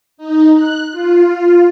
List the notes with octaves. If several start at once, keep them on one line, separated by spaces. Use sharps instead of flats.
D#4
F#6
F4